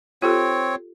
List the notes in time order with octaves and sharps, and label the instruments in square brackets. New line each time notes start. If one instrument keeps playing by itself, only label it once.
[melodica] C4 C#5 [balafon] F4 G4 A4